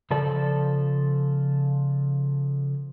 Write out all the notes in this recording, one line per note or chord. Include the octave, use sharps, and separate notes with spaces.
C#3 F3 A4 D5